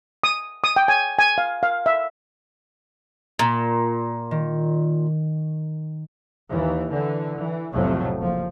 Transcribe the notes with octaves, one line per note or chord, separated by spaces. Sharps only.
D#6
D#6
G5
G#5
G#5
F5
F5
E5
A#2
D#3
D#2 E3
D3 E3
E3
B1 F2 A2 C3 F#3 A3
F#1 F3